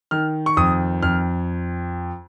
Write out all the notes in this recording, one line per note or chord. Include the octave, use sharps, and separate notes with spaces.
D#3 F6
C#6
F2 D#6
F2 F6